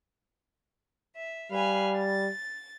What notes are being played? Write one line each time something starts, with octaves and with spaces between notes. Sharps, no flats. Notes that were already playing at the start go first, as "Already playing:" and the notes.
E5
G3 B4 F5 G#5
A6